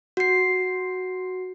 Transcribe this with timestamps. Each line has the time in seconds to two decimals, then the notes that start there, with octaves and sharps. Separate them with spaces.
0.17 F#4 C7